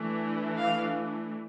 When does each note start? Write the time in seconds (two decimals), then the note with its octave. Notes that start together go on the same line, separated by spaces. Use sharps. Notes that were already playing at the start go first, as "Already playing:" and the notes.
Already playing: E3 A3 D4
0.56 F5